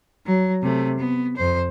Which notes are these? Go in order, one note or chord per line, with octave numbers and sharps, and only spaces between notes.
F#3
C3 A3
B3
F2 C5